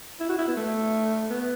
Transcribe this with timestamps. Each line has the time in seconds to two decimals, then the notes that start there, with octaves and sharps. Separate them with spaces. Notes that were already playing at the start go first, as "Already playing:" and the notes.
0.20 E4
0.29 F#4
0.38 E4
0.48 B3
0.56 A3
1.30 B3